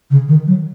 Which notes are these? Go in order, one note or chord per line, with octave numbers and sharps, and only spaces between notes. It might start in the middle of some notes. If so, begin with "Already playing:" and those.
C#3
D#3
F#3